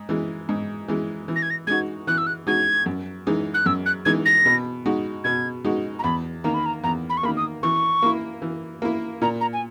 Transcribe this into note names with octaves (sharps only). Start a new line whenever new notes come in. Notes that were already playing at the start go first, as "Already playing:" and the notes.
Already playing: G#2
E3 G#3
G#2
E3 G#3
E3
A#6
G#6
A#6
G#3 D#4 F#4 G#6
E3 F#6
E6
F#6
G#3 D#4 F#4 G#6
F#2
E3 G#3 D#4
F#6
F#2 E6
F#6
E3 G#3 D#4 G#6
A#6
B2
G#3 D#4 F#4
B2 G#6
G#3 D#4 F#4
A#5
E2 B5
D#3 A#3 A#5
B5
A#5
E2 A#5
B5
C#6
D#3 A#3 B5
D#6
E3 C#6
A#3 E4
E3
A#3 E4
A#2 A#5
A#5
G#5